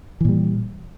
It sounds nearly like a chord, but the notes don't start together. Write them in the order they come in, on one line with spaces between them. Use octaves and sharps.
E3 A#2 G3